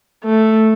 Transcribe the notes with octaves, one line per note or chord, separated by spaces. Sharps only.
A3